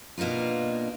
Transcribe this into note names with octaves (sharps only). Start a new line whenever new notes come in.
B2 A#3 D4 D#4 F4